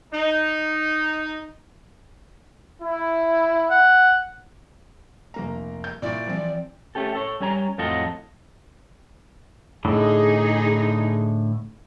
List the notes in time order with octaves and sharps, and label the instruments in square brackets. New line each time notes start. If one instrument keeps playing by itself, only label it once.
[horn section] D#4
[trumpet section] E4
[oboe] F#5
[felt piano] F1 A#3 A#5
G6
[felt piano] A#2 E4 C#6 [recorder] D5
[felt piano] E3 F3 C4
[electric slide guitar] A3 C#4 G4 A4
A4 C#5
G3 C#4 C#5 A#5
F2 A2 F#3 F4 A4 D#5
[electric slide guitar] A2 D3 [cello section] D#4 G#4